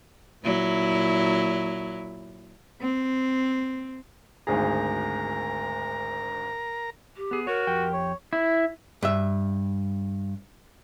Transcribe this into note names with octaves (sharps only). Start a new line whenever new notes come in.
A#2 F#3 E4
C4
G#1 D2 G#4 A#4 A#5
G4
B3 G#4
F#4 A#4 C#5
F2 G4 G5
C#5
E4
G2 E5